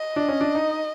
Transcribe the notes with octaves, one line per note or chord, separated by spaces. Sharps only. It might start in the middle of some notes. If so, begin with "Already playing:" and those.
Already playing: D#5
D4
C#4
D4
D#4